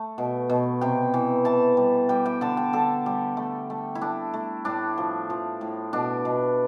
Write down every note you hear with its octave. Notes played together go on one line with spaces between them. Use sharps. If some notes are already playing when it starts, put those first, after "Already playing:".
Already playing: A3
B2
B2
C3 G5
E3
E3 A5
G3
G3 G5
G5
D3 A5
G5
D3 A4
G3
A3
A3
E4
A3 D4
A3
A2 D4
F3
F3
A2
B2 D4
B2